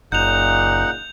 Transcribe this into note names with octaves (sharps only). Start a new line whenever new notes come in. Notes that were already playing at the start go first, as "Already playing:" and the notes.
F#1 A#2 C#3 D#4 F#5 G6 F7